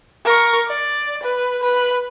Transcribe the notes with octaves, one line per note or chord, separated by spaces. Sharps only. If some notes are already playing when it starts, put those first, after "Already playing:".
A#4 C#6
D5
B4
B4 B5